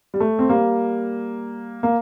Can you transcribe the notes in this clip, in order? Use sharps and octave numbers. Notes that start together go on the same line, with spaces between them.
G3
A3
C4
G3 A#3
A#3